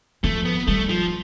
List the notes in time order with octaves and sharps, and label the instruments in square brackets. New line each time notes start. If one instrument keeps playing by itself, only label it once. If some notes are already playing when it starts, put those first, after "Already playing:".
[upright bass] F3 [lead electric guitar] A3
[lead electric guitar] B3
[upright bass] G3 [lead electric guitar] A3
[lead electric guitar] F3